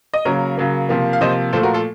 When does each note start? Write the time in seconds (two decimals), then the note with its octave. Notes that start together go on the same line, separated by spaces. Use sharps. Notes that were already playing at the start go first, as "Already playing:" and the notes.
0.14 D#5
0.25 C#3 F#3 A#3 A#4 C#5
0.57 C#3 F#3 A#3
0.89 C3 F3 A#3
1.13 F5
1.21 C3 F3 A#3 C5 D#5
1.53 A#2 F3 A3 A4 C5
1.63 F#4 A#4
1.74 F4 A4